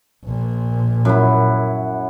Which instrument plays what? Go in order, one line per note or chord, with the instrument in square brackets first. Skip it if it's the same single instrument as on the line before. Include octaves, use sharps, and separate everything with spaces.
[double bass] A#1 A#2
[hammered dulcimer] F#2 E4